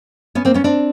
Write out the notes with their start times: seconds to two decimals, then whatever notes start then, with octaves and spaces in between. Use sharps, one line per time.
0.35 B3 C#4
0.45 A#3 C4
0.54 B3 C#4
0.64 C4 D4